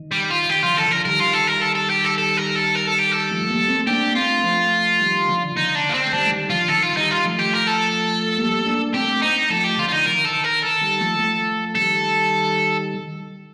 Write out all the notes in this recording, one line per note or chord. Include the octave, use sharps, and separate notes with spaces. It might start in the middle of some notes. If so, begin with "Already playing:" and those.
Already playing: D#3
G3
F4
D#3 G4
D3 F3 F4
D3 F3 A4
D3 F3 A#4
D#3 G3 A#4
F4
A4
A#4
A4
A4
G4
A4
A4
A#4
A4
A#4
A4
G4
A4
F3 A3
G3 A#3
A3 C4
A#3 D4 G4
A3 C4 F4
F3 A3
D#3 G3
D3 F3
D3 D#4
D4
D3
A#3
C4
A3
D#3 G3 D4
A3
D#3 G3
D3 F3 F4
D#3 A4
F4
D#3 G3 D#4
F4
F3 A3
G4
A#4
A4
G3 A#3
A#3 D4
A3 C4 G4
D#4
F3 A3 A4
G4
D3 F3 F4
F4
D#4
D#3 A#4
A4
D#3
A#4
A4
D#3 G3
F3 A3
F3 A3
D#3 G3 A4